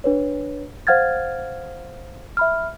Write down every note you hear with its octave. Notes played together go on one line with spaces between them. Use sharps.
D4 B4 C#5
C5 F5 F#5 F6 G#6 A6
E5 B5 F6